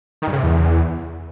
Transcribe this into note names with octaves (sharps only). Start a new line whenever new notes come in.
D#3
G2
C#3
C3
E2